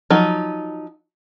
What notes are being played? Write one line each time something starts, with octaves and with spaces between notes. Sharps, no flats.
F3 F#3 D#4